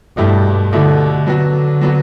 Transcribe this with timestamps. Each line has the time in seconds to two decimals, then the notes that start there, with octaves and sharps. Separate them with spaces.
0.17 G2 B2 A3 E4 G4
0.72 B2 D3 A3 E4 G4
1.26 D3 F#3 B3 F#4
1.81 F#3 B3 F#4